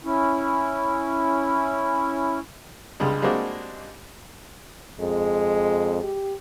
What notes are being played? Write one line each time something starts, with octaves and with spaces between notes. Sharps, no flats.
C#4 E4
C#2 D3 G3 G#3
G3 G#3 A#3 C4 D4 F#4
F2 G#3
G4